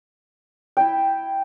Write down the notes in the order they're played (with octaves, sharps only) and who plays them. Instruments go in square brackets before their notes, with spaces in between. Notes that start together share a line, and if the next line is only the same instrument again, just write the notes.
[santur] E4 E5 G5